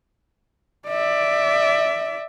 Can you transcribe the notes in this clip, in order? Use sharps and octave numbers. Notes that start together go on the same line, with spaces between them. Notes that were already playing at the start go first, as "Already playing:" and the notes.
D5 E5